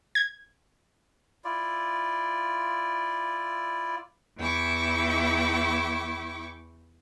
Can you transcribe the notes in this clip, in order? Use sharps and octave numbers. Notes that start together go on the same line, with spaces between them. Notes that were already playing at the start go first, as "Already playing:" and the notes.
G#6
E4 F4 D5
E2 E4 G5 C#6 D6